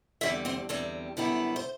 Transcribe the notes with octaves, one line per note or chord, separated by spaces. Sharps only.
E2 D3 G3 C4 E4 E5
C4 C5
E2 D3 G3 C4
F#2 D3 G3 B3 E4
C5